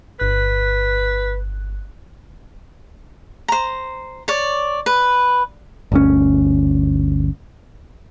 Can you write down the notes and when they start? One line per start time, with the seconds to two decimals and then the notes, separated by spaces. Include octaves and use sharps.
0.19 G1 B4 F#6
3.48 C5 A#5
4.28 C#5 D5
4.86 B4
5.92 G1 D2 C#4